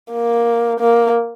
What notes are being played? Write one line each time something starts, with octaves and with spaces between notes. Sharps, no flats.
A#3
A#3